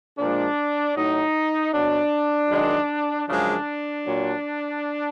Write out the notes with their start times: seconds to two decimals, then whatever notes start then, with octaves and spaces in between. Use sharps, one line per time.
0.18 A#2 F3 G#3 D4
0.96 A2 F#3 D#4
1.73 B2 F#3 D4
2.50 F#2 D#3 G#3
3.27 F#2 C#3 F3 G#3 D4
4.05 A#2 F#3